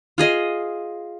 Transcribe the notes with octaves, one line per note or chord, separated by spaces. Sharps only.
F4 G#4 D#5